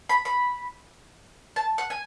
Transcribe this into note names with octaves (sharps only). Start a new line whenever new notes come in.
B5
B5
A5
F#5
G#5